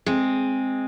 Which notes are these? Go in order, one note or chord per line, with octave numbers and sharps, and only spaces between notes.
G#3 C4